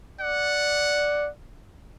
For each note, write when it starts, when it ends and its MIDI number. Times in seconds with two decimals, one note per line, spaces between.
0.20 1.28 74
0.20 1.29 78